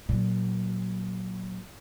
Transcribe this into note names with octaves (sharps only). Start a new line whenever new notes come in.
A#2 F#3